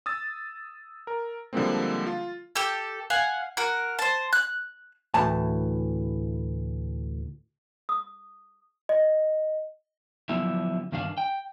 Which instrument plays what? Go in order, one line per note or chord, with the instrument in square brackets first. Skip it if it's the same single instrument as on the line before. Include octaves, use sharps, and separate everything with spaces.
[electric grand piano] D#6 E6 A6
A#4
D3 F3 G3 G#3 A#3 C4
F4
[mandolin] G4 A4
F5 F#5 G#5
F#4 A#4
C5 A5
F#6
[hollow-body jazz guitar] D2 A2 E3 A5
[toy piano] D#6
[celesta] D#5
[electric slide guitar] D3 F3 F#3 B3 E4
G2 D#3 D4 F5
G5